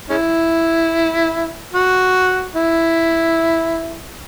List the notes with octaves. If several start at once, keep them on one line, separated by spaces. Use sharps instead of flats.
G#3 C#4 E4
F#4
E4